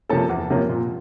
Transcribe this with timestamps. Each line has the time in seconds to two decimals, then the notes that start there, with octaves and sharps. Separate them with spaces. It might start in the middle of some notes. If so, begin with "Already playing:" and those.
0.09 C3 F3 A#3 C#4 A4 A5
0.29 E2
0.50 C3 F3 A#3 C#4
0.69 A#2